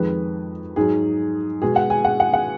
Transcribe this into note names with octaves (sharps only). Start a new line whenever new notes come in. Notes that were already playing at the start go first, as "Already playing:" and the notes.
Already playing: F2 D#3 G#3 B4
G#2 F#3 G#4
B2 G#3 G#4
F#5
G#5
F#5
F#5
F#5